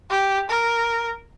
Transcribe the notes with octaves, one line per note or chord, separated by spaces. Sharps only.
G4
A#4